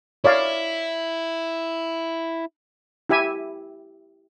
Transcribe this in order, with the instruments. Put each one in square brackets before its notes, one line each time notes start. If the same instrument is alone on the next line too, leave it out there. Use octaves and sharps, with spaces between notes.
[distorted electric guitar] E4 [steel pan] C#5 D5 F5
[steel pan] E4 G4 E5 G#5